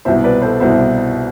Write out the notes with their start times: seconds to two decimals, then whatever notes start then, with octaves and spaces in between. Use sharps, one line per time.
0.05 C2 B2 C5 E5
0.24 B4 D5
0.42 A4 C5
0.60 C2 B2 C5 E5